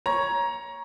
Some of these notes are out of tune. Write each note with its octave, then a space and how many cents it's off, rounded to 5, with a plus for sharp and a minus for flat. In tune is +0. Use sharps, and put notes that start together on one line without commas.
C#5 +0 A#5 +15